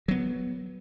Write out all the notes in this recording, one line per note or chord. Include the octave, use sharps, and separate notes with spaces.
F#3 B3